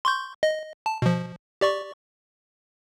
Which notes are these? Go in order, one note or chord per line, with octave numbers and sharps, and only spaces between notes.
C6 C#6 G6
D#5
A5
B2 F3
G4 D5 C#6